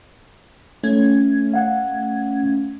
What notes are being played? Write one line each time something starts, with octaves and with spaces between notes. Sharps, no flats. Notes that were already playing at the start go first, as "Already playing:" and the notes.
A3 C#4 G#6
F5 F#5